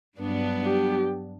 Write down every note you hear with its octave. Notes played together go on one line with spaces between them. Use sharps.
G2 F#3 B3 D4
G4